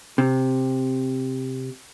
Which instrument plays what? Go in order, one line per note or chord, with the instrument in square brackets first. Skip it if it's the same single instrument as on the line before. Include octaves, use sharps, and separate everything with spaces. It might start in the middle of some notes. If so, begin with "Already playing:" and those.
[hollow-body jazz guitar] C3